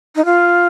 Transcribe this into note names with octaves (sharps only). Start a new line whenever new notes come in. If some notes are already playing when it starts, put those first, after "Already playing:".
D#4
F4